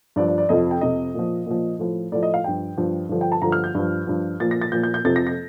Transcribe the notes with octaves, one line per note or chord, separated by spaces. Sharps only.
G2 F3 D5
D5
D5
F2 C3 F3 D#5
G5
F2 C3 F3 D#5
A#2 F3
A#2 F3
A2 F3
A2 F3 D5
D#5
F5
G2 F3 G5
G2 F3
G2 D3 F3
G5
A5
G2 D3 F3 A#5
F6
G6
G2 F3
G2 F3
A#2 F3 A6
A#6
A6
A#2 F3 G6
G6
G6
F2 C3 F3 A6
A#6
A#6